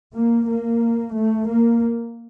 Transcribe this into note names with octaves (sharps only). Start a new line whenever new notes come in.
A#3
A#3
A3
A#3